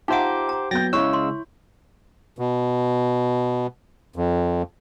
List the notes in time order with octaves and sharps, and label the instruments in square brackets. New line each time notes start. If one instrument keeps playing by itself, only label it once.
[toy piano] D#4 F#5 [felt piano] F4 E5 A#5 [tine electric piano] G4 C5 D6
[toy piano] A#5
[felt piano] F#3 B3 G6 [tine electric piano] G5 A6 A#6
[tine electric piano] C#3 G#3 E6 [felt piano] E4 [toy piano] C#5 C#6
[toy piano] C6
[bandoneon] B2
F2